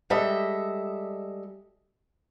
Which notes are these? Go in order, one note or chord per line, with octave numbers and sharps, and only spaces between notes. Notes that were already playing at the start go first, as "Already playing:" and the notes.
G3 G#3 A4 D#5 E5